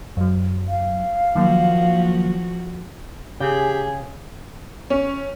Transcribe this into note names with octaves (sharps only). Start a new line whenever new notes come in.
F#2 F#3
F5
D#3 F3 F#3 A#3 F#4
C#3 G4 G#4 G#5
C#4